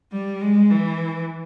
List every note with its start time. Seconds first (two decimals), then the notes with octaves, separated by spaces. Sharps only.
0.12 G3
0.41 G#3
0.70 E3